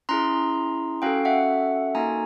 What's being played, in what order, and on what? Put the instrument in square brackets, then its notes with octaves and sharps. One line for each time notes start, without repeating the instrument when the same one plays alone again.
[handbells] C#4 E4 G#4 A#5 C6
C#4 F#4 A4 F5 G5
E5 F#5
A#3 D#4 F#4 A4 G#5 A#5